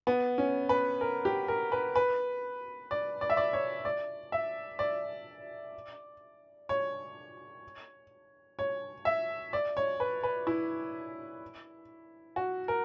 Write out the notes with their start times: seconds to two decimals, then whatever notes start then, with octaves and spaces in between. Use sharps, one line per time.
0.07 B3
0.38 C#4
0.69 B4
1.01 A#4
1.25 G4
1.48 A#4
1.72 B4
1.96 B4
2.91 D5
3.21 D5
3.30 E5
3.37 D5
3.53 C#5
3.85 D5
4.32 E5
4.79 D5
6.69 C#5
8.59 C#5
9.05 E5
9.53 D5
9.77 C#5
10.00 B4
10.23 B4
10.47 E4
12.36 F#4
12.68 A#4